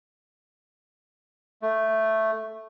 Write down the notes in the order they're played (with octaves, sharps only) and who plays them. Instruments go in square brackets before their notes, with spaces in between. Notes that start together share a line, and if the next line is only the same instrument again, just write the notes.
[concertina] A3